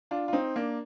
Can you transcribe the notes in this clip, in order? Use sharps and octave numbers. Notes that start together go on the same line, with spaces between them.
D4 F4
F4
C4 D#4
A#3 D4